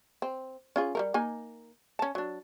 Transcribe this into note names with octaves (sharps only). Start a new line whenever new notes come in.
C4
C#4 F4 G#4
G3 A3 A#4
A#3 D#4 G#5
C#4 A5
F#3 D4